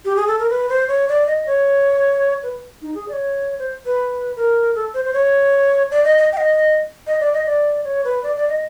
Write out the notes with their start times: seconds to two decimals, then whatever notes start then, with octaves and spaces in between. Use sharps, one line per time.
0.05 G4
0.16 G#4
0.27 A4
0.39 A#4
0.49 B4
0.69 C5
0.88 C#5
1.09 D5
1.27 D#5
1.47 C#5
2.43 B4
2.82 D#4
2.94 G#4
3.08 D5
3.13 C#5
3.59 C5
3.86 B4
4.36 A#4
4.75 A4
4.94 C5
5.05 C5
5.13 C#5
5.91 D5
6.04 D#5
6.18 D#5
6.33 G5
6.37 D#5
7.07 D#5
7.20 D5
7.33 D#5
7.46 D5
7.84 C#5
8.05 B4
8.23 D5
8.36 D5
8.49 D#5